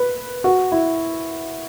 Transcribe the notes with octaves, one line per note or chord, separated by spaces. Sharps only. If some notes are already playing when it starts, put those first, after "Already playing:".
Already playing: B4
F#4
E4